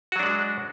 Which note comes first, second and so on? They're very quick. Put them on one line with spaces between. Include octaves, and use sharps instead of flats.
F#4 F#3 D4 G#3